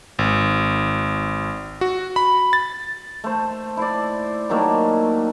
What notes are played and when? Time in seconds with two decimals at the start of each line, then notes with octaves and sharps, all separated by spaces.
0.19 G#1
1.81 F#4
2.16 B5
2.53 A6
3.24 A3 C5
3.77 E4 C5 D5
4.50 D#3 F#3 A3 A#3